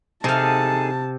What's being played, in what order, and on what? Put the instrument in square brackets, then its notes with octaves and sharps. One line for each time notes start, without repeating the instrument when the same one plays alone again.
[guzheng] C3 F5 [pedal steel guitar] D#4 G#4 A4 [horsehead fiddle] A5